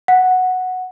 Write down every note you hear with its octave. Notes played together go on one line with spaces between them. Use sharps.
F#5